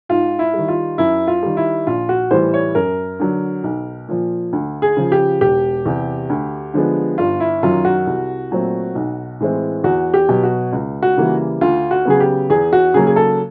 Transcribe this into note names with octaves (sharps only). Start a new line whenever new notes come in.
G#2 F4
E4
D#3 G3
F4
F#2 E4
F4
D#3 G3
E4
A#1 F4
F#4
A2 E3 G3 C5
C#5
F#2 A#4
D3 F#3
B1
A#2 F3
D2
G#4
C#3 F3
G4
E1 G4
E2 C3
D2
D3 F3 G#3 B3
G1 F4
E4
F#2 D#3 F#3 F4
F#4
C2
A#2 F#3 A3 C4
B1
A2 E3 G#3 C4
E2 F#4
G4
B2 F#3
F#4
C#2
F#4
C#3 E3 G3 A#3
D2 F4
F#4
C#3 F#3 B3 G#4
G4
E2 G#4
F#4
C#3 F#3 A#3 G#4
G#4
A4